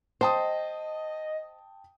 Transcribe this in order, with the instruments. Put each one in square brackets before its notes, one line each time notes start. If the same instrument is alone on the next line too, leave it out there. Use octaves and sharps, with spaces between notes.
[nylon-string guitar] C5 [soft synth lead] D#5 [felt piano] G5 A5 D#6